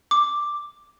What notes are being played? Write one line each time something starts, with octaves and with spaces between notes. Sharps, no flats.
D6